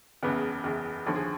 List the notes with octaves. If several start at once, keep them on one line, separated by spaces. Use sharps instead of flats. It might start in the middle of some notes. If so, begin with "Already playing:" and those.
F#1 E2 C#3 B3 B4
F#1 E2 C#3
D#2 D3 F3 A4
G#4